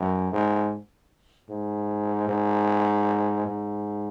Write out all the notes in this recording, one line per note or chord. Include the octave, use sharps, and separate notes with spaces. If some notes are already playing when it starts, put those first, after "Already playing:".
Already playing: F#2
G#2
G#2
G#2
G#2